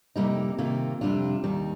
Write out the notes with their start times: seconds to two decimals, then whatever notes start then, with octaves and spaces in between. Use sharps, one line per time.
0.16 F2 C3 G3 A#3 D#4
0.58 C3 D#3 A#3 F4
1.01 F2 C3 G3 D4 F4
1.44 D#2 D#3 G3